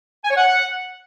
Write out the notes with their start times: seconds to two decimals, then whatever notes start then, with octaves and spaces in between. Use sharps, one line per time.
0.24 G#5
0.30 C#5
0.36 F#5